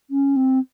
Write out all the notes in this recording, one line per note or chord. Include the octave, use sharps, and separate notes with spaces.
C#4
C4